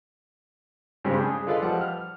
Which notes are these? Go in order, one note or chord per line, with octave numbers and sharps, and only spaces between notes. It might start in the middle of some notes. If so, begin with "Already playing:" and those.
G2 C#3 G3 G#3 C4
D4 G#4
F4 A4 B4 D5 D#5 F5
F3 G3 F#5
F6